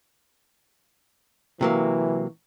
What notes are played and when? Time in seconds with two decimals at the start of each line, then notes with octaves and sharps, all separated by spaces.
1.61 C3 E3 F#3 A#3